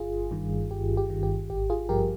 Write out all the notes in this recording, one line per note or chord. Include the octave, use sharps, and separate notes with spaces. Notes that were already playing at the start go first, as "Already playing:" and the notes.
Already playing: G1 F4 G#4
G2 D#3
G1 G4
G4
G2 D#3
G4
G#1 G4
F4 G#4
G2 F3 G4 A#4